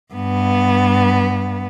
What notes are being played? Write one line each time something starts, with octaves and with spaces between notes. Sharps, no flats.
G2 B3